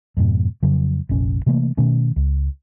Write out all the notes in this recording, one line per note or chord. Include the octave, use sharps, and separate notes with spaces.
F2 G#2 B2
F2 C#3 F#3
F1 A#1 C#4
C3 E3 A3 A#3
B2 D#3 A3 C#4
C#2